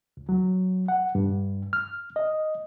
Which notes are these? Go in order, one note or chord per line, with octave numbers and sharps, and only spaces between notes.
C#2
F#3
F#5
G2
F6
D#5